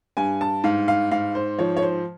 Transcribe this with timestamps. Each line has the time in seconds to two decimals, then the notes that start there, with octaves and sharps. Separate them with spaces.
0.17 G2 G#5
0.41 A5
0.64 G#2 F5
0.88 F5
1.11 G#2 F5
1.35 C5
1.59 F3 C#5
1.77 C#5
1.82 C5